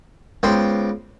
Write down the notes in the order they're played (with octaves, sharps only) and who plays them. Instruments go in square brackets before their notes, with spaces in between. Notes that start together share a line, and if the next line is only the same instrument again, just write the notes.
[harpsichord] C#2 B3 C5 G5